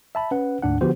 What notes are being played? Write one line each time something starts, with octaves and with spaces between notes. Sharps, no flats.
E5 A5 B5
C#4 B4 F#5
D2 G#2 D4 F#5
D3 F3 B3 F#4 G4 C5